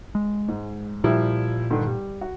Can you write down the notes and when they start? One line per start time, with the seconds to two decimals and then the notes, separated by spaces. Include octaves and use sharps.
0.15 G#3
0.48 G#2
1.04 A#2 F3 G3 E4
1.70 G2 D3 D#3
1.87 G3
2.21 F#4